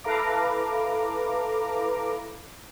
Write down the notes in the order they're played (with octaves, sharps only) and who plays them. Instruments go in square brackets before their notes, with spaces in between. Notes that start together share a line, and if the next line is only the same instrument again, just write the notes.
[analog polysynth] E4 A4 B4 F5 A#5 D6